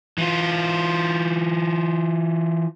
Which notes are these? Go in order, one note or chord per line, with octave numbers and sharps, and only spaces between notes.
E3 F4